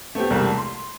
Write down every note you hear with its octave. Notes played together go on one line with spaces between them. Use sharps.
A3 B3 C4 G4
E1 C2 G3 A3 A#4 A5
C6